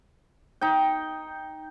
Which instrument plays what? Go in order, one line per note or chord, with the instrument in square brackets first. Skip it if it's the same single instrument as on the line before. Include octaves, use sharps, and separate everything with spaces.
[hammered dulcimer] D#4 G5